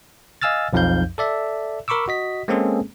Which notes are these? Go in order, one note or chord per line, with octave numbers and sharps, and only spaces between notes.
D#5 F5 G#5 E6 F6 A6
B1 F2 F3 D#4 F5 G6
A4 D5 E5
A#4 B5 C#6 D6 E6
F#4 D#5 B6
G#3 A#3 C4 C#4 G#4 A4